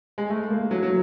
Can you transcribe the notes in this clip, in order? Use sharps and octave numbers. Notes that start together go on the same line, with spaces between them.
G#3
A3
A#3
F#3
F#3